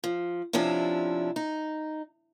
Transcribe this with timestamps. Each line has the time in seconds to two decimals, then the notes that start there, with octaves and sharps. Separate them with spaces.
0.04 F3
0.53 C3 F3 C#4 D4 E4
1.36 D#4